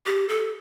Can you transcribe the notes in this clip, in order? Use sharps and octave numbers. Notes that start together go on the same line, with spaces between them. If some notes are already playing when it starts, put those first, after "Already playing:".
G4
A4